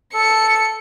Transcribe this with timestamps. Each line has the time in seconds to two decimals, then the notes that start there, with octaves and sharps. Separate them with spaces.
0.14 A4 C#7